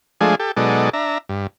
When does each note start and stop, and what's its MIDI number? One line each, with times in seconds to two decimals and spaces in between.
0.21 0.35 53
0.21 0.35 56
0.21 0.35 57
0.21 0.35 62
0.21 0.35 68
0.40 0.52 67
0.40 0.52 69
0.57 0.90 47
0.57 0.90 54
0.57 0.90 56
0.57 0.90 63
0.57 0.90 69
0.57 0.90 74
0.93 1.18 62
0.93 1.18 76
0.93 1.18 82
1.29 1.47 43